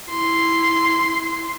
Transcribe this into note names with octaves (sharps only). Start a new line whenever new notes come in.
E4 C6